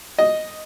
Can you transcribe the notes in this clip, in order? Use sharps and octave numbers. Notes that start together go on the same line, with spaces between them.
D#5